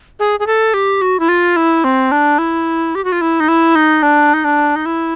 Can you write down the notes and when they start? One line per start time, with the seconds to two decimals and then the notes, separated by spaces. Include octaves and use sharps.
0.19 G#4
0.40 G#4
0.47 A4
0.74 G4
1.01 F#4
1.20 E4
1.29 F4
1.56 E4
1.84 C4
2.12 D4
2.38 E4
2.95 G4
3.05 F#4
3.12 F4
3.21 E4
3.40 D#4
3.48 E4
3.75 D#4
4.03 D4
4.34 D#4
4.44 D4
4.76 D#4
4.86 E4